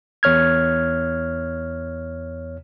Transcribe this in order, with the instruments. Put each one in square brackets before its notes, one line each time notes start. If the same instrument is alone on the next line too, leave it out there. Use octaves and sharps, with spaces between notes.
[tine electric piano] E2 C#5 F6 G#6